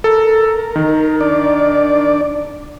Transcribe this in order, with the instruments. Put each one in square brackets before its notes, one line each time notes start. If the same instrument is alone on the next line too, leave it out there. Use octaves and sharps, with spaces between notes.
[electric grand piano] A4 [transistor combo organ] A#4
[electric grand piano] D#3
[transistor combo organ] D4 D5